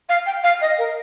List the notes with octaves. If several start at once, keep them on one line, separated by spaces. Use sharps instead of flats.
F5
G5
F5
D#5
A#4